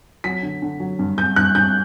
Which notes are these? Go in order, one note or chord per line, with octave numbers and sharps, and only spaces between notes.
F#3 B6
D3
D3
F#3
G2
G2 G6
G2 F#6
G2 G6